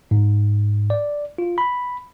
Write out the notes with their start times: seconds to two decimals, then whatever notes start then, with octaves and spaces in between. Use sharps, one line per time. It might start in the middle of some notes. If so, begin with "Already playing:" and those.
0.11 G#2
0.90 D5
1.38 F4
1.58 B5